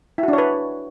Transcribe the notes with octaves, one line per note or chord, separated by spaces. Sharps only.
E4
F#4
D4
C#5
B4